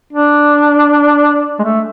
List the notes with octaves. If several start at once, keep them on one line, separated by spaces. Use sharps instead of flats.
D4
G#3
A3